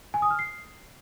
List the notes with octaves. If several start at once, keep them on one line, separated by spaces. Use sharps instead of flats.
G#5
D#6
F6
C7